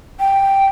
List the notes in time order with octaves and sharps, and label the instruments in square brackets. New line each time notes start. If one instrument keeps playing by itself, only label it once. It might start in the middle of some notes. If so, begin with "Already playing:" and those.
[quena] G5